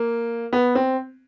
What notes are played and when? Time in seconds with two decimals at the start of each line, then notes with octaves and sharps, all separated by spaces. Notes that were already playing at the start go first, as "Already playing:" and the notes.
Already playing: A#3
0.53 B3
0.75 C4